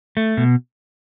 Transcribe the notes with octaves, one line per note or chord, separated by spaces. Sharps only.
A3
B2